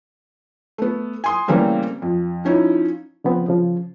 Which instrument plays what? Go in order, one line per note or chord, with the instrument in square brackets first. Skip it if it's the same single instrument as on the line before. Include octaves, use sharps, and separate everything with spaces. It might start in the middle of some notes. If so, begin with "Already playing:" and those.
[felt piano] A3 B3
G#5 C6 D#6
C#3 E3 G3 A3 A#3 C4
F2
F3 C#4 D#4 E4
[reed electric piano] C#3 F3 B3 C4
C#3 F3